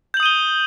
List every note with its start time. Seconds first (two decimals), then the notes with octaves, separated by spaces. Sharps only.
0.14 G6
0.17 F#7
0.20 D#6
0.23 D#7
0.26 G7